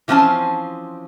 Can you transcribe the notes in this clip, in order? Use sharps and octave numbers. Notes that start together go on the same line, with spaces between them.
E3 F3 C4 C#4 A5